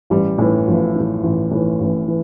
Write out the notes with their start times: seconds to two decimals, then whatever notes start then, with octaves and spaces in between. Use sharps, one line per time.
0.10 A1 G3
0.38 A2 E3
0.67 A1 F3
0.96 A2 E3
1.23 A1
1.51 A2 E3
1.81 A1
2.08 E3